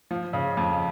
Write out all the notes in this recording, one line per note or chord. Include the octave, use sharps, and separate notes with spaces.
F3
C#3
F2